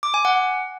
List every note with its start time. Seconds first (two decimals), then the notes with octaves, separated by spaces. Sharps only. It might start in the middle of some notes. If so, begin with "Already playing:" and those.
0.03 D6
0.14 G#5
0.25 F#5